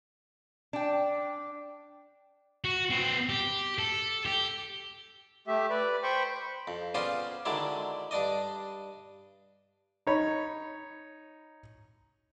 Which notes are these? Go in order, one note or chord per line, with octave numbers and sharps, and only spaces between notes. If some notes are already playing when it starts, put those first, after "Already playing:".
D4 G5
F#4
C4 B4
G4
A4
G4
A3 G4 E5
B4 D5
C5 G5 B5 C#6
F2
B3 C#4 F4 G#4 C5 D5
D3 D#3 F#3 G#3 E4 D5
G2 D4 D5 D#5
D#4 C#5 B5